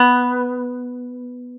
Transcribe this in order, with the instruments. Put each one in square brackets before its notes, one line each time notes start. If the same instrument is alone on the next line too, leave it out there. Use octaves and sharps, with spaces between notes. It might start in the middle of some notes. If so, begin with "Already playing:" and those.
Already playing: [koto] B3